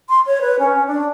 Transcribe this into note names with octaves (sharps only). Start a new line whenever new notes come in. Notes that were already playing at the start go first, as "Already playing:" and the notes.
C6
C#5
B4
C#4
D4